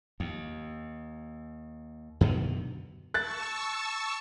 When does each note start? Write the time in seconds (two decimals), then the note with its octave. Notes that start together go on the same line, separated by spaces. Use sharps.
0.20 D#2
2.21 F#2 B2 D3 D#3
3.14 A5 C#6 E6 F#6 A6